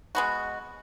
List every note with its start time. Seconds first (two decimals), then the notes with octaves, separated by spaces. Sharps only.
0.15 G#3 B3 F#4